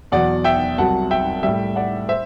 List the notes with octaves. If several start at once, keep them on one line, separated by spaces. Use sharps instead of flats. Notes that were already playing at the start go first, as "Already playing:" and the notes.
E2 B2 F#3 D5 F#5
E5 G5
C2 C3 F#3 F#5 A5
E5 G5
A2 G3 E5 G5
D5 F#5
C5 E5